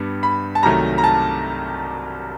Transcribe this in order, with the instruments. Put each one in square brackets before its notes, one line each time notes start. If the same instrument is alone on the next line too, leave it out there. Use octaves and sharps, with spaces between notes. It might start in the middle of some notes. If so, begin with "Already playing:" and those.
Already playing: [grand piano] G2 G3 B3
B5
A5
C2 C3 D#3 F#3 A3 A#5
A#5
A5